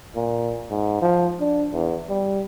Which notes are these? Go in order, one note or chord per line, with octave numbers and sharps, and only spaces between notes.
A#2
G#2
F3
D4
E2
G3